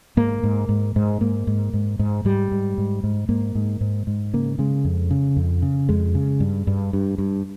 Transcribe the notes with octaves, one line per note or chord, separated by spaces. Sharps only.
G#2 A#3
G#2
G#2
G#2
G#2 A#3
G#2
G#2
G#2
G#2 G3
G#2
G#2
G#2
G#2 A#3
G#2
G#2
G#2
C#3 A#3
C#3 G#3
F2
C#3
F2
C#3
F2 G#3
C#3
G2
G2
G2
G2